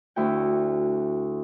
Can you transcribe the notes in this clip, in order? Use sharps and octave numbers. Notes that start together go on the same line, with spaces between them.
D2 E4 F#4 G5